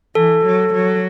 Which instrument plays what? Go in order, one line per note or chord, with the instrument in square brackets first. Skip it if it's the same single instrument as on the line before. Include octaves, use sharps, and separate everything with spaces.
[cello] E3 [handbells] A4
[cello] F#3
F#3